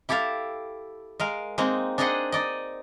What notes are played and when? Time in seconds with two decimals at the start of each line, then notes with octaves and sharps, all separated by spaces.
0.09 E4 G4 A4 E5 F5
1.20 G#3 A#4 F5
1.58 G#3 A#3 C4 D#4
1.98 D4 D#4 G#4 C5 D#5 F#5
2.32 D#4 D5 D#5